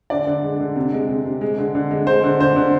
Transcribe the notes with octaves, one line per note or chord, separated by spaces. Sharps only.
D3 D5
D3
G#3
D3
C3
G#3
C3
C3
G#3
D3
D3
G#3
G#3 C5
D3
D3 C5
D3